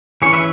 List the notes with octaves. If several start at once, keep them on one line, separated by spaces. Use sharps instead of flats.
E3 C#4 G#4 C#5
B4 E5